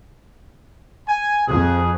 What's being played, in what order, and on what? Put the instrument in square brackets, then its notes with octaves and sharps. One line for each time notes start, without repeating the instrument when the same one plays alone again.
[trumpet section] G#5
[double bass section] F2 [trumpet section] G#4